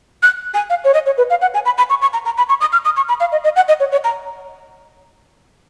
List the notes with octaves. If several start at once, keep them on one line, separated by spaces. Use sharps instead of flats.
F#6
G#5
F5
C#5
D#5
C#5
B4
F5
F#5
G#5
B5
B5
C#6
C#6
A#5
A#5
B5
C#6
D#6
F6
D#6
C#6
B5
F5
D#5
D#5
F#5
D#5
C#5
C#5
A#5